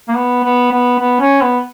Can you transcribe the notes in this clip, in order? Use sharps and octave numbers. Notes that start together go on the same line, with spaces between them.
A#3
B3
B3
B3
B3
C#4
B3